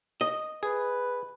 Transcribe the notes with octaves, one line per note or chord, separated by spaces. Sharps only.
D#5
G#4 B4